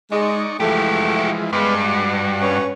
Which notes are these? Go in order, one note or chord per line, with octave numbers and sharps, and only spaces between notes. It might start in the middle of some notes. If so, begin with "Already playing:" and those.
G#3 D#4 D5 C#6
E3 F3 G#3 A3 F#4 G4
G2 G#3 B3 B4 F5
F#4
C#4 B4 C#5